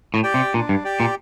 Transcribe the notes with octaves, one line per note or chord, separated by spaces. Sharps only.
A2
G4 D5 G5
C3
A#2 D4
G2
G4 D5 G5
A#2